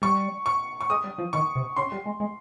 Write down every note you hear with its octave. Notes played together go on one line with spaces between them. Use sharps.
G3 C#6
C#6
C#6
G#3 D#6
G3
F3
D#3 C#6
C3
C#3 C6
G3
G#3
G#3